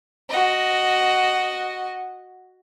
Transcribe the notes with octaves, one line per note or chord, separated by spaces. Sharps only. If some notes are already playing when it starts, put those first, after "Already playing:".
F#4 D#5